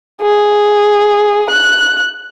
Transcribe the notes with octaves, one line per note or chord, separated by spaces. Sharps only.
G#4
F#6